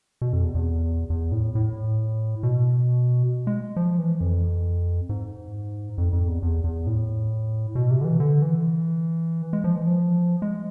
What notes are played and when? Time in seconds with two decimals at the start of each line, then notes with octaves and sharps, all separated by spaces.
0.21 B2
0.33 F2
0.44 E2
0.55 E2
1.10 E2
1.32 A2
1.55 A2
2.43 B2
3.47 G#3
3.76 F3
3.98 E3
4.21 F2
5.09 G#2
5.98 F2
6.13 F2
6.28 E2
6.42 E2
6.64 E2
6.87 A2
7.75 B2
7.91 C3
8.01 D3
8.05 E3
8.20 D3
8.42 E3
9.53 G#3
9.64 F3
9.76 E3
9.87 F3
10.42 G#3